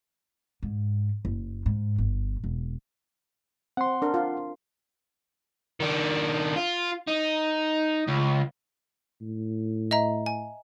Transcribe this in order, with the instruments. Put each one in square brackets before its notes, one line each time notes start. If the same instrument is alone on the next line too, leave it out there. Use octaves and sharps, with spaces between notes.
[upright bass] G#2
F#1
G#2
G1
E1
[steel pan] C4 [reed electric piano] F#5 C6
[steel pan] D4 A#4
F4
[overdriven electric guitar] D#3 D4
F4
D#4
C#2
[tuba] A2
[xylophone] D#5 E5 A#5
G#5